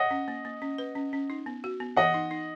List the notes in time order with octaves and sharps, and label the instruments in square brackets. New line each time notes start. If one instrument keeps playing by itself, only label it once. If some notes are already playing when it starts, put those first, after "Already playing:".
Already playing: [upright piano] D#5 F#5
[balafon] C#4
A#3
A#3
C#4
B4
C#4
C#4
D#4
B3
F#4
B3
[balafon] E3 [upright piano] D#5 F#5
[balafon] D#4
D#4